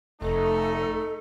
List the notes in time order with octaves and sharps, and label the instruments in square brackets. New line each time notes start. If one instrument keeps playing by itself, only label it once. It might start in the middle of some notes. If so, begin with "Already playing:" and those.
[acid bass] F1 [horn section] A3 D#4 [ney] A4